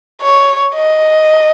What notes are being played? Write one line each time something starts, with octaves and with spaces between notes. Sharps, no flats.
C#5
D#5